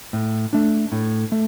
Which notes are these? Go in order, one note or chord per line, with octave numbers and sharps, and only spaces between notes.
A2
A3 D4
A2
A3